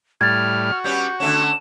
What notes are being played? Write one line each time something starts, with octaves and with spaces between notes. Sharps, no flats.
A2 G3 F6 G#6 A6
F#4
G3 B3 C#4 G6
D3 A3 C#4 E7